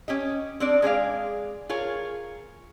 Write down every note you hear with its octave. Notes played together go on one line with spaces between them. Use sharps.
C#4 G4 D#5
C4 D4 D5
G#3 G#4 D5 F5
F4 G#4 A#4 C#5